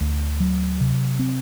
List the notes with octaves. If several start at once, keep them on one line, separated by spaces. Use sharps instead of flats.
D2
F#3
C3
C4